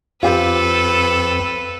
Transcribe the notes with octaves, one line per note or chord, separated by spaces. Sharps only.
F2 C4 F4 G4 A4 B4